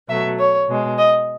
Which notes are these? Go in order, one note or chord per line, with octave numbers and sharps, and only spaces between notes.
B2 F#3 A3 E5
C#5
B2 G#3
D#5